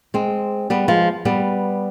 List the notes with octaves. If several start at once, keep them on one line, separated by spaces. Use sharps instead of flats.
G#3 C4
G3 B3
F3 G#3
G3 B3